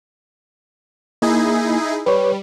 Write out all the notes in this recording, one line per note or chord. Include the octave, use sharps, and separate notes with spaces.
A#3 D#4 E4 G#4
G3 B4 C#5